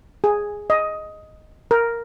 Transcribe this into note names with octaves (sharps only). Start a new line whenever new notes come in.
G#4
D#5
A#4